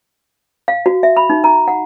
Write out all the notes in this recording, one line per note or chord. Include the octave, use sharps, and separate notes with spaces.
F5
F#4
E5
B5
D#4
A#5
F#5